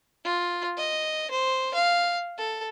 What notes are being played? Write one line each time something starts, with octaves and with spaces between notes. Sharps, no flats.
F4
D#5
C5
F5
A4